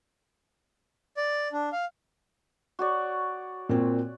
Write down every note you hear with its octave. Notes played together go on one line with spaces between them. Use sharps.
D5
D4
F5
F#4 C#5 D5
A#2 C4